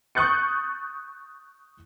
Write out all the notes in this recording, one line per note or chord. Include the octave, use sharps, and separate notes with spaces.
C#6 D#6 F#6 G6 A6 C#7